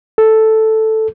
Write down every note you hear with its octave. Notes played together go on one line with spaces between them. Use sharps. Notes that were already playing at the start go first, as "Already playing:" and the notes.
A4